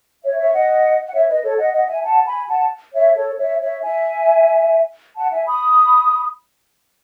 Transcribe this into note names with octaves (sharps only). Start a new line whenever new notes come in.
C#5 E5
C#5 E5
D#5 F#5
F#5
C#5 E5
B4 D#5
A4 C#5
D#5 F#5
D#5 F#5
E5 G#5
F#5 A5
G#5 B5
F#5 A5
C#5 E5
A4 C#5
C#5 E5
C#5 E5
E5 G#5
F#5 A5
E5 G#5
B5 D#6